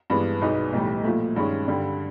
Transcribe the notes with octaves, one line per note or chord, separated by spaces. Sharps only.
G2 E3 G#3 B3
B1 B2 G#3 B3 D#4
B1 A2 E3 G3
A#2 F3 A3
G2 D#3 G#3 C#4
G2 D3 G3